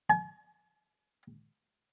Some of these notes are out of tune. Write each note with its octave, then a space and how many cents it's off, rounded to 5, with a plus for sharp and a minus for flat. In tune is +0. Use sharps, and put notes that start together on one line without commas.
G#5 +40